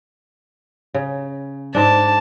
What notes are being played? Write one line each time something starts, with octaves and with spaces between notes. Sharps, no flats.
C#3
G#2 D4 A5